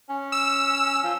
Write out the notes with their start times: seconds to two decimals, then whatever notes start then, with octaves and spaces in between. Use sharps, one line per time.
0.10 C#4
0.32 E6
1.04 F3